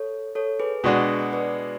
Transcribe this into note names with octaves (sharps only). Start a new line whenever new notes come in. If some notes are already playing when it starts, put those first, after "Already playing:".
Already playing: A4 C#5
A4 C#5
G#4 B4
B2 G#3 D4 F#4 G#4 B4
B4 D5